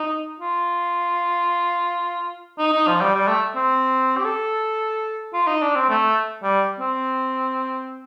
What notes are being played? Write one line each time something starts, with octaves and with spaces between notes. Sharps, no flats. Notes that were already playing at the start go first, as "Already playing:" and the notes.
Already playing: D#4
F4
D#4
D#4
F3
G3
G3
A3
C4
G4
A4
F4
D#4
D4
C4
A3
G3
C4